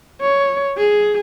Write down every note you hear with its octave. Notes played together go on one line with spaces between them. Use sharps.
C#5
G#4